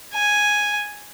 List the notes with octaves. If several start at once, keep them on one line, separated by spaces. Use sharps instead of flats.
G#5